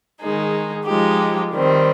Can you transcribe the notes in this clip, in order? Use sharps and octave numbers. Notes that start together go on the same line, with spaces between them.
D#3 G#3 D#4 G#4
F3 G#3 D#4 G4
D#3 G3 C4